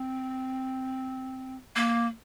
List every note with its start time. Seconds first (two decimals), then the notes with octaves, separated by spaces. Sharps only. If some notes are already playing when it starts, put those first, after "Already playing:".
Already playing: C4
1.76 A#3